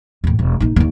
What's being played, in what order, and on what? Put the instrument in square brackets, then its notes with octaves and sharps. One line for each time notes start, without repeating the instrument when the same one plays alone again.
[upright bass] E2 A2
E1
A#1 D#4
D#2 D3